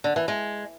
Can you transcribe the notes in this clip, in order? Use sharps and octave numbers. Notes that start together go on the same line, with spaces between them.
D3
E3
G#3